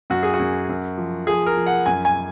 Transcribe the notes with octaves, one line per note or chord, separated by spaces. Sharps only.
F#2 F#4
G#4
F#4
F#2
F#2
F3
F3 G#4
A#4
F3
F#5
F#2 G#5
G#5